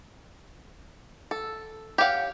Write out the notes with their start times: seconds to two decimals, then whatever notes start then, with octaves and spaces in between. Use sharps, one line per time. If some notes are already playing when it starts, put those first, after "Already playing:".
1.31 A4
1.98 G4 C#5 F5 F#5